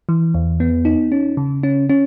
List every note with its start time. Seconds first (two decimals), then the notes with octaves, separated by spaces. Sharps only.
0.09 E3
0.34 E2
0.60 B3
0.85 D#4
1.12 C#4
1.37 C#3
1.63 C#4
1.89 C#4